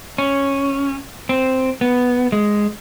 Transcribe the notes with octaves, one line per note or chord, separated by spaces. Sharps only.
C#4
C4
B3
G#3